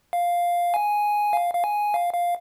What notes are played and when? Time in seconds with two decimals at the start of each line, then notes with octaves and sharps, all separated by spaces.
0.13 F5
0.74 G#5
1.33 F5
1.54 F5
1.64 G#5
1.94 F5
2.14 F5